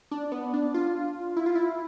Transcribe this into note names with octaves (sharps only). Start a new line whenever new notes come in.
D4
B3
D4
F4
E4
F4
E4